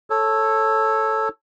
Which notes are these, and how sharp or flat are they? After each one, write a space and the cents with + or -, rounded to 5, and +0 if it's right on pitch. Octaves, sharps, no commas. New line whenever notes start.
A4 +0 C#5 -15